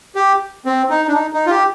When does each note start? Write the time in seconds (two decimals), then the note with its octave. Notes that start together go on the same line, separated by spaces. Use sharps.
0.15 G4
0.65 C4
0.90 D#4
1.08 D4
1.14 D#4
1.33 D#4
1.46 F4
1.51 G4